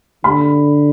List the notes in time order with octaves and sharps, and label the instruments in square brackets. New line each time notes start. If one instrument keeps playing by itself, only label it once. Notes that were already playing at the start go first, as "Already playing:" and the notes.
[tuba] D3 [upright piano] B5